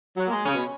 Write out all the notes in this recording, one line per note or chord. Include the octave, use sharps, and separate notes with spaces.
F#3
A#3
G#3
C#3 C#4
B2